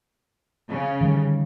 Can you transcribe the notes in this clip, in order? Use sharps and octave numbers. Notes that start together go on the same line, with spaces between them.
C#3
D3 D#3 G3